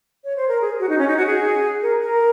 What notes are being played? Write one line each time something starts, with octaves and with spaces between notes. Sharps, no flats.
C#5
C5
A#4
G#4
F#4
D#4
C#4
D#4
F#4
G#4
A#4
A#4